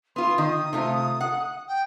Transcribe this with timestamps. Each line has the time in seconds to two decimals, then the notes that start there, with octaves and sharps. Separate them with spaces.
0.16 B3 F4 C6
0.38 D#3 D#6
0.73 C3 A3 F4
1.21 F#5
1.68 G5